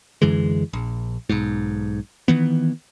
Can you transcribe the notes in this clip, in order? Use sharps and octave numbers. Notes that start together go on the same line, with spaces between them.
F#2 D3 E3 G#3
A#1
B1 G#2
D#3 E3 B3